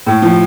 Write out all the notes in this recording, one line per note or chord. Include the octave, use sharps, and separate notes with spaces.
A2
F3